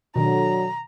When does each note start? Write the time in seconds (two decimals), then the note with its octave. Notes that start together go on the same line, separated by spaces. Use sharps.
0.16 B2 D#3 F#3 D4 A4 A#5